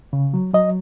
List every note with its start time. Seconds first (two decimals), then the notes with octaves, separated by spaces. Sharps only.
0.13 C#3
0.34 F#3
0.54 F#3 D#5